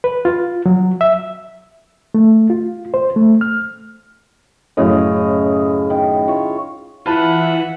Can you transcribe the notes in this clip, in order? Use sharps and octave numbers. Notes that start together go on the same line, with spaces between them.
B4
F4
F#3
E5
A3
F4
C5
A3
F6
F#2 A2 C#3 D#5
D#3
E4 F4 C#5
E3 E4 F4 B4 E5 F#5 A5